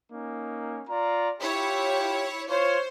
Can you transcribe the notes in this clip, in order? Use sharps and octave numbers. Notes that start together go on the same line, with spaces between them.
A#3 C#4 D#4
F4 D5 A#5
E4 F4 G4 C#5
F4 C5 C#5